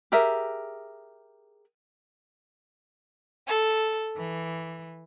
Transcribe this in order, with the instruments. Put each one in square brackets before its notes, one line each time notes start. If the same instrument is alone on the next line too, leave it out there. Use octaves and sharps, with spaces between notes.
[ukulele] G4 G#4 A#4 E5
[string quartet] A4
E3